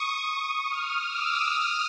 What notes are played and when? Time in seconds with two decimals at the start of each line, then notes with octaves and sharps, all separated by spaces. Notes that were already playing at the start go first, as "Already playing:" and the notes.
Already playing: C#6 D#6
0.68 D#6 F6
1.06 D6 E6
1.44 D#6 F6